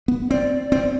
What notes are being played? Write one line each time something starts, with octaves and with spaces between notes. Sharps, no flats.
B3
C4 D5
C4